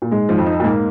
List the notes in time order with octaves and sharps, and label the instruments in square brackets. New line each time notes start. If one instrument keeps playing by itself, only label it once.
[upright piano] A#2
[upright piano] G#2 [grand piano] G#3
[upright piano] G#2 [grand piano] F3
[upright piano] F2
[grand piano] D#4
[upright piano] A#2
[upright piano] G#2 [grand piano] A#3